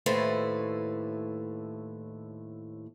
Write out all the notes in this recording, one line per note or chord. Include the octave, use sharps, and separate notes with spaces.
D#2 A2 A3 B4 C5